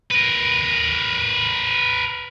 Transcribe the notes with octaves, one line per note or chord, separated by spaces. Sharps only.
A#4 B4